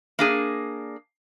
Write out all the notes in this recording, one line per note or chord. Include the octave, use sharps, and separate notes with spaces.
A#3 D4 G#4